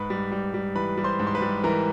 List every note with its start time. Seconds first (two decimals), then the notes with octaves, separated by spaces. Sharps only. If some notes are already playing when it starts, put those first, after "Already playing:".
Already playing: G#2 B4 B5
0.10 G3
0.32 G3
0.54 G3
0.75 E3 B4 B5
0.97 G3
1.04 C5 C6
1.20 G#2
1.27 C6
1.35 B4 B5
1.42 G3
1.64 E3 A#4 A#5